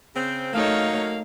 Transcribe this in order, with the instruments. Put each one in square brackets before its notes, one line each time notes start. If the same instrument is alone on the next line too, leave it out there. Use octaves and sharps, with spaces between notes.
[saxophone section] C#3 C4
[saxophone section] F#3 A#3 F5 [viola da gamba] A3 D#4 C#5